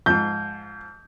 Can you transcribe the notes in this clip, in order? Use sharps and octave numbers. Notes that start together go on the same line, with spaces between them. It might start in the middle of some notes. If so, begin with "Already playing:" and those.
G#2 F3 G6